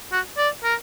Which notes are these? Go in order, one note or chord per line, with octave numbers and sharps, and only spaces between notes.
F#4
D5
A#4